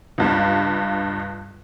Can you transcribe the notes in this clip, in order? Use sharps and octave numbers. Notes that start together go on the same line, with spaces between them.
C#2 G2